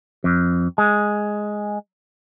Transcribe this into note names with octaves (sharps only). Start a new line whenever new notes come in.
F2
G#3